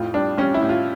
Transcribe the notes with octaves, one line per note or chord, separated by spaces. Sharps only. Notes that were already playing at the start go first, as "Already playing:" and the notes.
Already playing: F2 A2 F4
G3 D4
G3 C#4
E4
A2
F4